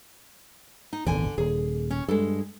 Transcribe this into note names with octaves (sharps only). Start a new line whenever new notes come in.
D#4
D#1 G#1 E2 D3 G#5
D#1 G#4
C#4
G2 G#3 A4